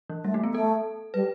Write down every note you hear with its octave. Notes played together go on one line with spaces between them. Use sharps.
E3
G3 A3
A3
B3
A3 A4
G3 B4